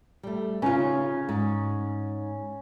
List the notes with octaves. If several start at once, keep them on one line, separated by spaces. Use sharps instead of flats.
G3 A3
C#3 C#4 D#4 F4
G#2